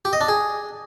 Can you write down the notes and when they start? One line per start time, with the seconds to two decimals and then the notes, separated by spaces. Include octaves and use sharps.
0.05 G4
0.13 D#5
0.21 D4
0.28 G#4